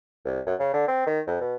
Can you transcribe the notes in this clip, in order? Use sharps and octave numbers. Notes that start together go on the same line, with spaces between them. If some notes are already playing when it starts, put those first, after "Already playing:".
C2
F#2
C#3
D3
C4
D#3
F2
B2